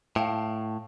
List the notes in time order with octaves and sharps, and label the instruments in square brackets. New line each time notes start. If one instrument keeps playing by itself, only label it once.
[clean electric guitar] A2 [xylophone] F5 G5 A5